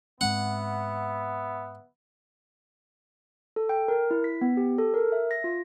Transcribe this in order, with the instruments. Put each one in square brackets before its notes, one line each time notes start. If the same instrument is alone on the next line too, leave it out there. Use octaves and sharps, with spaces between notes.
[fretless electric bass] G#2 G#3 C4 [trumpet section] B3 E5 [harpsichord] F#5
[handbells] A4
G5
A#4
E4
B6
B3
G4
A4
A#4
E5
A#6
F4